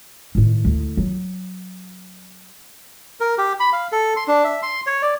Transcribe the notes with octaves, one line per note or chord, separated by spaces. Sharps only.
A2 D#3
D2 E4
F#3
A#4
G4
B5
F5
A4
C6
D4
E5
C6
C#5
D5